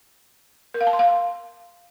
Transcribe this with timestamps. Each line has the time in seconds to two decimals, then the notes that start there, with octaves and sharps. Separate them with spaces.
0.74 A#4
0.81 F5
0.87 A5
0.93 C6
0.99 F5